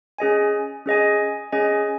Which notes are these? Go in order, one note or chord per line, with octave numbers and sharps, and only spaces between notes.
C#4 G#4 D#5 G#5
C#4 G#4 D#5 G#5
C#4 G#4 D#5 G#5